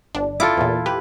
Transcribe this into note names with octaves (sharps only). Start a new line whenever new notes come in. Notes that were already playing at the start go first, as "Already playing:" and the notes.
G1 D4
E4 F4 A4 D6
E2 A#2
G4 B4